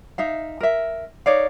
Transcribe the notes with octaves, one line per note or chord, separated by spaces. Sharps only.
D#4 E5 F5
A#4 E5
D#4 C#5 D5 F5